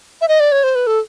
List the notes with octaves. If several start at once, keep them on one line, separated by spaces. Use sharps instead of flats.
E5
D#5
D5
C#5
C5
B4
A4